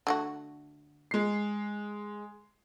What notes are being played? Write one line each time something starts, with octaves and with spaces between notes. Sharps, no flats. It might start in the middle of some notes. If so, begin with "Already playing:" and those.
D3 A3 F#4
G#3 C7